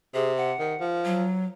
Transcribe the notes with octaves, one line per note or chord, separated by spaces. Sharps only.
C3 G#4
F#5
D#3
F3
F#3